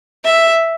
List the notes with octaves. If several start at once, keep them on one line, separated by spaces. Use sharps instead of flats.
E5